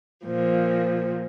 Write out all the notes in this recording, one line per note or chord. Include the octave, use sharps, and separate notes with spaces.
A#2 F3